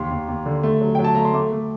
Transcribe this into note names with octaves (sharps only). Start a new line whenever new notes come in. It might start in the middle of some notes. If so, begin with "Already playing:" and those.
Already playing: D#2 C6
D#2
D#2
D3
A3
F#3
F#3 G5
A5
A3 A#5
C6
A3 D6
A3